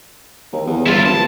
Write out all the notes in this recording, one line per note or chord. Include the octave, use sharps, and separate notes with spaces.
D#2
E2
G1 E4 F4
D1 A5